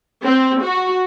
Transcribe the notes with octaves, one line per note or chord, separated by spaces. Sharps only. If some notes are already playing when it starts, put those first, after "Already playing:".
C4
F#4